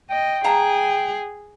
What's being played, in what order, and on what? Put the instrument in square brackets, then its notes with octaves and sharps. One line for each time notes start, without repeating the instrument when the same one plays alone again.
[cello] D#5 [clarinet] G5
[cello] G#4 [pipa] F5 A5 A#5